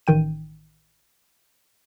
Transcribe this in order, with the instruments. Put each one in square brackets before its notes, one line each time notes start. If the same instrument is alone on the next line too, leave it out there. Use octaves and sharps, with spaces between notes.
[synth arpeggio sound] A1 D#3 G5 D#7